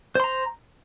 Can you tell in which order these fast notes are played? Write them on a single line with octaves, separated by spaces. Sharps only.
C5 C6 A#5